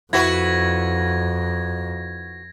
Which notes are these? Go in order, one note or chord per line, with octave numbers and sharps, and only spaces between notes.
F2 E4 F#4 B4 G#6 A#6